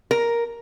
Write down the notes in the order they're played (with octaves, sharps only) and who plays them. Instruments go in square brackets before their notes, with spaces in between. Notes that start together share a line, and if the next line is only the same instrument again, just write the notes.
[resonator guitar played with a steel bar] A#4